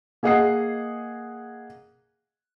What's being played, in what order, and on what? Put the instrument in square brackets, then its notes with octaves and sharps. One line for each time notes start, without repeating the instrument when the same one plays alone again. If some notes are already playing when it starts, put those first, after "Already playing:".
[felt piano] A#3 G#4 D#5 F#5 D#6 C7